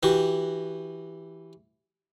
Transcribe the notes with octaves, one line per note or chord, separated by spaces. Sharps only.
E3 F#4 G4